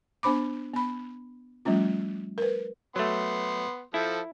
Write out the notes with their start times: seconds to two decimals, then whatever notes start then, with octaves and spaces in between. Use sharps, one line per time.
0.23 B3 D4 C5 B5 D6
0.74 B3 B5
1.65 F3 G3 A3 C#4 F4
2.38 A#4 B4
2.96 F#3 A3 B3 C6
3.94 F3 E4 A4